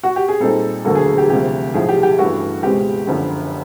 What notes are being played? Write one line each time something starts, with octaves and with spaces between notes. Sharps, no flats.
F#4
G4
G#4
A#2 G3 C4 D#4 A4
E1 D2 D3 F#3 A#3 A4
G#4
G4
D2 C3 F3 G4
B1 A2 F3 G#4
G4
G4
G2 E3 A3 C#4 F#4
C#2 B2 G#3 C4 G4
F#1 F#2 D3 F3